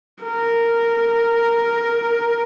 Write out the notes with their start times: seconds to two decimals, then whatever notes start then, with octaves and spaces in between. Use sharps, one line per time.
0.23 A#4